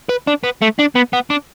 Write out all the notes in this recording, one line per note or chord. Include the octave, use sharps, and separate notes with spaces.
B4
D4
B3
A3
D4
B3
B3
D4